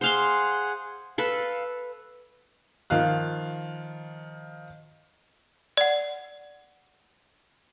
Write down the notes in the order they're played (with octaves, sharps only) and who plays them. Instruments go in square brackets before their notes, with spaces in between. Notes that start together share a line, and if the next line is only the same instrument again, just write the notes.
[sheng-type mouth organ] G#4 F#5 [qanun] C5 F5 C6
[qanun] A4 B4 [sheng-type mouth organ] F5
[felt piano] D#3 F3 F5 F#6
[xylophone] D5 F#5